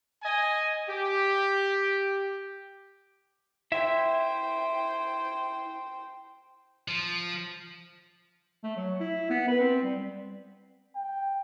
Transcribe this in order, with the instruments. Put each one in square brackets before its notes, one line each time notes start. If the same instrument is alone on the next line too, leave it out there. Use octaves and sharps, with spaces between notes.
[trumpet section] D#5 G#5
G4
[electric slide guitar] E4 E5 [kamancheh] C5 G5
[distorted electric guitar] F3
[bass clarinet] A3
F#3
E4
B3
B4
C4
G3
[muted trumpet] G5